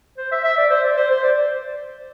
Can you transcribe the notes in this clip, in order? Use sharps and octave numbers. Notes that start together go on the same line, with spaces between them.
C5
E5
E5
D5
C5
D5
C5
C5
D5